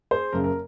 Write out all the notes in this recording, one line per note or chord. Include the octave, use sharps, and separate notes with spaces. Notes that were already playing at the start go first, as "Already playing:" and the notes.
G#4 C5
F#1 F#2 C#3 A#4
A#4